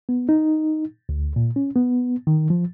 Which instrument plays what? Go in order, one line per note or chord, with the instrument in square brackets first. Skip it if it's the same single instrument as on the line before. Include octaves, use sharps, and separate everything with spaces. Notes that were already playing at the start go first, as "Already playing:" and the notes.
[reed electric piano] B3
D#4
D2
A#2
C#4
B3
D#3
F3